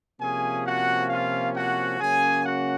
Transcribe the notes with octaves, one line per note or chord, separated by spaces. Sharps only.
C3 F3 A#3 C#4 G#4 G#5
F#4 F#5
F4 F5
F#4 F#5
C#3 F#3 A#3 C#4 G#4 G#5
F#4 F#5